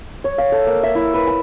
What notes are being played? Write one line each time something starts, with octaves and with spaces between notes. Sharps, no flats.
C#5
F5
A4
A#3
E5
E4
B4
E6